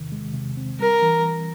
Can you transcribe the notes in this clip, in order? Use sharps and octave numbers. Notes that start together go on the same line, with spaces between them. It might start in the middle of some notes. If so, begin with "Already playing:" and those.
Already playing: E2 C3 D#3
G#3
C3
C4
G3 A#4
E3